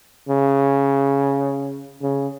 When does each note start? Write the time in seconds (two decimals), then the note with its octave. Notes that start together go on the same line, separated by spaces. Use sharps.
0.29 C#3
2.02 C#3